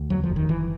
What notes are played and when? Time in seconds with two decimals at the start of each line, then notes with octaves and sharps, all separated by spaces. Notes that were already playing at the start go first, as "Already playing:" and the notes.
Already playing: D2
0.10 E2 F#3
0.24 F3
0.29 F#1
0.36 D#3
0.49 F#1 E3